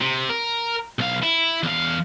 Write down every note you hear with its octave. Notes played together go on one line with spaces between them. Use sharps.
C3
A#4
B1 F5
E4
E2 F5